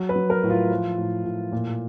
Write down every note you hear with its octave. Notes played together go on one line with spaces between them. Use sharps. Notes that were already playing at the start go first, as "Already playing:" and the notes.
Already playing: F#3
B4
F#3
A#4
A2
F4
F3
A2
A2
A#2